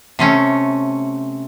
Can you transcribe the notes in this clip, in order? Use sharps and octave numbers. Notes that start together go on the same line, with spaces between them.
C3 A3 C#4